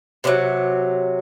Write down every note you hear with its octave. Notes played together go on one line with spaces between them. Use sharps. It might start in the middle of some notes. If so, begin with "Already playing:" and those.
C3 D#3 F#3